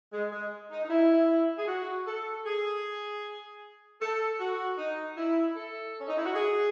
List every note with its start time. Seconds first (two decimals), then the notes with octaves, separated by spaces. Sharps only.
0.13 G#3
0.33 G#3
0.71 D#4
0.85 D#4
0.90 E4
1.58 G#4
1.68 F#4
2.07 A4
2.46 G#4
4.01 A4
4.40 F#4
4.78 D#4
5.17 E4
5.57 A4
6.01 C#4
6.08 D#4
6.18 E4
6.26 F#4
6.35 G#4